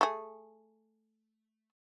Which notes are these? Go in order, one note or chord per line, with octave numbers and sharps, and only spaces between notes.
A3 G#4